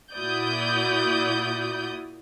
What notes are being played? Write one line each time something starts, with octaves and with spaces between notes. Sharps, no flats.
A#2 E4 F#4 D5 D#6 G6